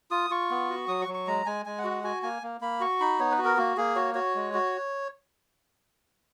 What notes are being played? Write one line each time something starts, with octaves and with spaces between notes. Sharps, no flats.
F4 D#6
F4 C#6
B3
F#4
F#3 D#6
C#6
F#3
C#6
G#3 A#5
G#3 G#5
G#3 G#5
F#5
F#4
F#5
F#4 G#5
A#3 G#5
A#3
A#3 B5
F#4 C#6
D#4 B5
B3 C#5
B4
F#4
A#4
A#3 F#4
A#3 G#4
F#4 C#5
F#4 C#5
G#3
F#4